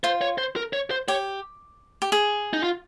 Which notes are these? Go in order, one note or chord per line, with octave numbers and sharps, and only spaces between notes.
F4 C5
C#5
C5
A#4
C#5
C5
G4 C#5
G4
G#4
D#4
F4